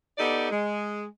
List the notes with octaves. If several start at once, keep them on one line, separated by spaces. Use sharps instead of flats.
B3 D#4 G4 A4 D5
G#3